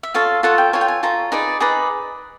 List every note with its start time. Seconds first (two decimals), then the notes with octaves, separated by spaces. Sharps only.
0.03 E5
0.14 F4 A4 C#5 F5
0.43 F4 A4 C#5 F#5
0.58 G5
0.73 F4 A4 C#5 G#5
0.81 G5
0.88 G#5
1.03 F4 A4 C#5 A#5
1.32 D#4 G#4 B4 D5
1.60 D#4 G#4 B4 D5 A#5